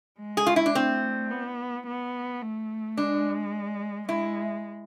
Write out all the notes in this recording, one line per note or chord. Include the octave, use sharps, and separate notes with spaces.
G#3
G#4
F4
E4
D4
A3 C4
B3
B3
A3
G#3 D4
G#3 E4